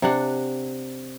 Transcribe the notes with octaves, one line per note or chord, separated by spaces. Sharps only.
C3 D4 F#5